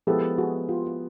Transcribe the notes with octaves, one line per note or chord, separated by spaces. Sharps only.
F3 G#3 B3 E4 G4 A4
F#4 G#4
F4 G4